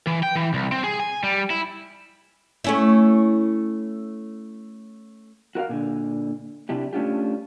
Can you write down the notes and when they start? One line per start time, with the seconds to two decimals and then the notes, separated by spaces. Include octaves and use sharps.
0.07 E3
0.23 G5
0.36 E3
0.54 C2
0.72 C4
0.84 G#4
1.00 G#5
1.23 G3
1.50 E4
2.64 A3 C#4 E4
5.55 F#4 A#4 E5 F5
5.69 A#2 D3
6.69 C3 D4 E4 G4
6.93 A3 C#4 D4 F4 G4